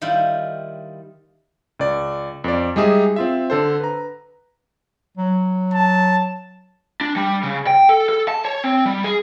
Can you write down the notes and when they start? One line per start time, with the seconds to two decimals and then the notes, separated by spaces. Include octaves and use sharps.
0.01 D#3 G3 E4 F4
1.80 C#2 D5
2.44 F2 C5 D5
2.76 G3 G#3 D#4 G#4 E5
3.16 C4 F4 E5
3.50 D3 A4 C5
3.80 B4 A#5
5.17 F#3
5.73 A5
7.01 D4
7.16 G3
7.43 C#3
7.67 G5
7.89 A4
8.09 A4
8.28 A5
8.45 C#5
8.64 C4
8.86 G3
9.04 G#4